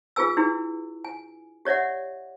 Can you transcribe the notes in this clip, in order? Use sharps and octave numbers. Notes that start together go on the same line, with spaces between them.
F4 G#4 B4 G#5 E6
D4 E4 F#4 G#4
G#5
G4 C#5 D5 E5 F#5